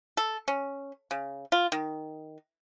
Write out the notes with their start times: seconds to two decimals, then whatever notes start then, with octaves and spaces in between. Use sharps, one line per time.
0.17 A4
0.48 C#4
1.11 C#3
1.52 F4
1.72 D#3